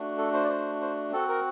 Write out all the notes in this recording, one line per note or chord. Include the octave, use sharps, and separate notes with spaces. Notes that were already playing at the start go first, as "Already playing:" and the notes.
Already playing: A3 D4 F#4
A4
C5
D5
C5
C5
C4 F#4 A4
A#4